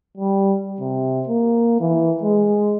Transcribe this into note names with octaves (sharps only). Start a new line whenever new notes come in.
G3
C3
A#3
E3
G#3